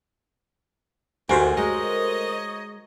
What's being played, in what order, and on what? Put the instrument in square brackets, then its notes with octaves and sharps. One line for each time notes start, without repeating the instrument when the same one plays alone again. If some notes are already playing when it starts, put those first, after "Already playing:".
[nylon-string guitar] D2 [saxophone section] G#2 [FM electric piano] A3 A#4 C5 [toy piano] F#4 G4 G#5
[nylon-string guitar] G#3 [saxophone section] D#4 C#5 D#5